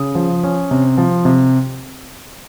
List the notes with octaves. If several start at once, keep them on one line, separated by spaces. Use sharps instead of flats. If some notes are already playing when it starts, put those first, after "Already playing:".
Already playing: C#3 D#6
F3
C#4
C3
F3
C3